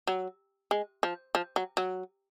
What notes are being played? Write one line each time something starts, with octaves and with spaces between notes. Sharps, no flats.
F#3
G#3
F3
F3
F#3
F#3